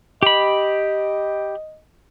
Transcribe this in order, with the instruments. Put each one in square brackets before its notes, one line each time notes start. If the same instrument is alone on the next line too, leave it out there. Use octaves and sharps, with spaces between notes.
[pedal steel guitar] G4 B5 [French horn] D#5